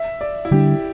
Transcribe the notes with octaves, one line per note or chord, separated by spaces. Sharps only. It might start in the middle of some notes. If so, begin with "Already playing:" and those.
Already playing: E5
D5
E4
D3 G3 D4 G4